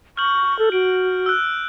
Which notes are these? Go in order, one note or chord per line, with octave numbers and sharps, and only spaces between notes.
C#6 F6 G6 F#7
A4
F#4 D7
E6 F#6